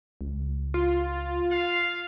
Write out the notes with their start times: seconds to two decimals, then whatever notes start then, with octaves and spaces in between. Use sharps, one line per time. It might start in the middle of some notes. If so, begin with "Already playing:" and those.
0.21 C#2
0.74 F4
1.52 F5